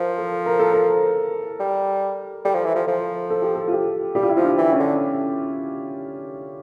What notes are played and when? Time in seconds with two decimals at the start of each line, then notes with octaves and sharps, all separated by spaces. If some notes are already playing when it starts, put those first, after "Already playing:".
Already playing: F3 A#4
0.18 A4
0.46 A#4
0.59 A4
0.74 A#4
1.60 G3
2.45 G3 A4
2.55 F3
2.65 E3
2.76 F3
2.87 F3 A4
3.30 A4
3.42 G4
3.55 A4
3.68 F4
3.72 G4
4.15 G3 G4
4.23 F4
4.29 E4
4.37 F3 F4
4.44 D4
4.58 E3
4.72 C#4
4.79 D3